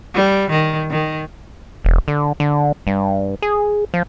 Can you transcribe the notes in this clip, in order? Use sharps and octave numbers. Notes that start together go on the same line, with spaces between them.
G3
D#3
D#3
E1
D3
D3
G2
G#4
F3